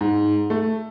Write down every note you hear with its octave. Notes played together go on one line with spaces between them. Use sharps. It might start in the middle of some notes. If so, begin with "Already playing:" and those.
G#2
A3